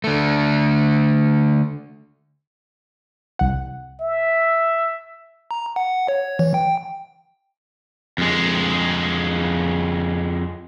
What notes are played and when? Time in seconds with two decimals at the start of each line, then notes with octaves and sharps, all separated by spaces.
0.04 D3 A3
3.39 C2 F#5
4.01 E5
5.51 A#5
5.76 F#5
6.08 C#5
6.39 E3
6.54 G5
8.18 F2 G#3